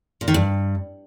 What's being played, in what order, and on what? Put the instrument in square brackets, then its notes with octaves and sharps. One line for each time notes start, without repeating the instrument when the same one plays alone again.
[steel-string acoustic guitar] A#2
D#3
G2